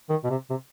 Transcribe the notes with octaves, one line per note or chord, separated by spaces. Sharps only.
D#3
B2
C3
C3